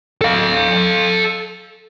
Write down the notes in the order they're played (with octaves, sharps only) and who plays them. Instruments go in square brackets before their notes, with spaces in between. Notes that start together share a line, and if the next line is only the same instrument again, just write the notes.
[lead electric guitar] A4 F5